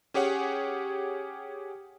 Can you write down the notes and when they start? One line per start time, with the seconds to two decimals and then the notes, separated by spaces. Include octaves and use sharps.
0.14 C#4 G4 G#4 C#5 F#5